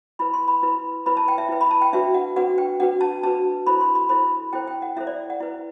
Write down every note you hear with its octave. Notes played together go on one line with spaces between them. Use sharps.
E4 B4 B5
C6
B5
E4 B4
E4 B4 B5
A5
G5
E5
E4 B4
B5
A5
G5
D4 F#4 B4 E5
F#5
D4 F#4 B4 F#5
G5
D4 F#4 B4 F#5
A5
D4 F#4 B4 A5
E4 A4 C5 B5
C6
B5
E4 A4 C5 B5
E4 A4 C5 G5
G5
F#5
E4 A4 C5 E5
D5
F#5
E4 B4